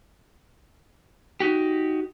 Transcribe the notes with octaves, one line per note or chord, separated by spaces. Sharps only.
D#4 F#4 G4